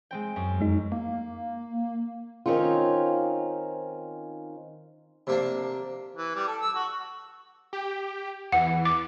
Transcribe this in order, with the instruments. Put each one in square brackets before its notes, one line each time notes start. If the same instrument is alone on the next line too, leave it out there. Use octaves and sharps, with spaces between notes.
[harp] G#3 C4 G5
F#2
[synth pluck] F2 G#3 D#4
[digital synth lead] A#3
[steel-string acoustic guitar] D#3 C4 C#4 D#4 F4
[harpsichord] C3 A#3 D4
[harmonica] E3
G3
A4
E6
F#4
[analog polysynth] G4
[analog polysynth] E2 E3 [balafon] F#5
[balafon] D6